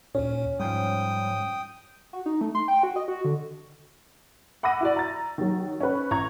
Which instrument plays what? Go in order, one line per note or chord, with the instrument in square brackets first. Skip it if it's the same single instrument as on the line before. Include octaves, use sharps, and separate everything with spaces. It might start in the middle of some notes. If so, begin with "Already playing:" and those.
[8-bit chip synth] D#2 A#2 [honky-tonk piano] C#4
[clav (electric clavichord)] G#2 F3 [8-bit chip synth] G3 [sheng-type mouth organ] G5 D#6
[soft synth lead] F#4
D#4
A3
C6
G5
F#4
D#5
F#4
D3
[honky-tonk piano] F#5 B5 D6 E6 A#6 D#7
E4 F#4 D5
A#5 A6
D#3 F#3
C#4 B4
A1 A#5 C#6 G#6